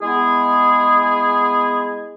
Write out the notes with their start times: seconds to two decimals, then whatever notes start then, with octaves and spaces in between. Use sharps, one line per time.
0.01 G#3 B3 E4 G#4